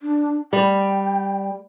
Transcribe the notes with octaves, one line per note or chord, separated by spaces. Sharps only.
D4
G3 G5